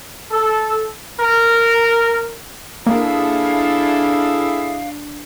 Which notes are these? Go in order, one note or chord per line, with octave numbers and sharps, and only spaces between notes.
A4
A#4
A#3 D4 E4 G#4 A4 F5